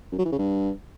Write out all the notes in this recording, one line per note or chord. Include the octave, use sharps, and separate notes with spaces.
F#2
F#3
E3
C#3
G2